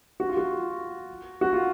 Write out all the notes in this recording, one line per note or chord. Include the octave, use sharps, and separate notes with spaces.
F#4
F4
F#4
F#4
F4